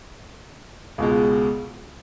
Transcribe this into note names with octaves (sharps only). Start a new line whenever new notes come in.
C#2 B2 G#3